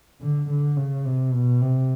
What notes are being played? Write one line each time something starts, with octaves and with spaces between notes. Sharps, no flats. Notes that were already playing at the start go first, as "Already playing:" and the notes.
D3
D3
C#3
C3
B2
C3